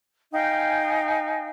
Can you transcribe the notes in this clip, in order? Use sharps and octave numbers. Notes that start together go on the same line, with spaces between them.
D#4 F5 G5 G#5